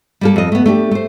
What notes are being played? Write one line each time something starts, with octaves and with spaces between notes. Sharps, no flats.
G3 A#3 A4
F2 D#5
A3 B3
A3 D4 G4
A3 C5